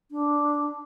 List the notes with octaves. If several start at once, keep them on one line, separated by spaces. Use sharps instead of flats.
D4